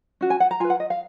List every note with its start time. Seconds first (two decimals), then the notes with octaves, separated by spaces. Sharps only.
0.21 C#4 F#4
0.30 G#5
0.40 F#5
0.51 A#5
0.60 F4 B4 G#5
0.70 F#5
0.80 D#5
0.90 F5